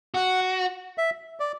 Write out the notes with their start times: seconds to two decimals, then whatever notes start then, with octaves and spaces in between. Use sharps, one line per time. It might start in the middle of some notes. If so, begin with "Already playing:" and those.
0.14 F#4 F#5
0.98 E5
1.40 D5